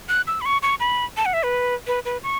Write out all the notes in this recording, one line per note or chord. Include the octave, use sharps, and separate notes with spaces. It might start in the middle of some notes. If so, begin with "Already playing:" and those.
F#6
E6
B5
C#6
C#6
B5
A5
F#5
E5
B4
B4
B4
C#6